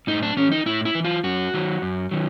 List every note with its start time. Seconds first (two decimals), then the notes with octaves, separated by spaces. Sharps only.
0.07 A2 D#4
0.23 D4
0.37 E3 C#4
0.52 D#4
0.66 A2 E4
0.85 E4
0.95 E3
1.05 F4
1.24 F#2 F#4
1.54 D#3 F#3
1.82 F#2
2.11 D#3 F#3